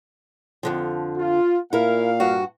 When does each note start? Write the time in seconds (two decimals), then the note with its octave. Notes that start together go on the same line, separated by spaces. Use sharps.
0.63 F2 D3 F3
1.18 F4
1.73 A#2 E4 A#4 F5
2.20 G2 F#4